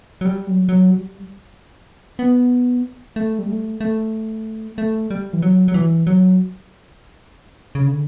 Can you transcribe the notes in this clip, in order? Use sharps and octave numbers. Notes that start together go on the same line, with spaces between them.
F#3
G3
F#3
F#3
G3
B3
A3
G3
A3
A3
A3
G3
E3
F#3
F#3
E3
F#3
C#3
D3